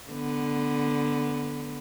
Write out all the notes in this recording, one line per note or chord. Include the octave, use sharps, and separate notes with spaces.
D3 B3